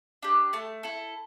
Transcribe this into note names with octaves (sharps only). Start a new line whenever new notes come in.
D4 G4
A3 A5
E4 A4